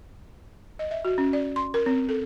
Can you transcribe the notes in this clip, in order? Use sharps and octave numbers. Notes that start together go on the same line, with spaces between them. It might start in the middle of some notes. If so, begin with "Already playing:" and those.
D#5
E5
F#4
C#4
D5
C6
A#4
C4
A4